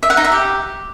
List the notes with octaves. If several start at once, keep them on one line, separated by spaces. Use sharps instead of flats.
E5
F#5
D#4
E5
G4